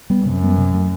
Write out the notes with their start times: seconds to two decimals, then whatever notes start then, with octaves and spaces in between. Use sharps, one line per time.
0.10 G3 B3
0.25 F#2 C3
0.42 G3 B3
0.58 C3
0.74 F#3 A3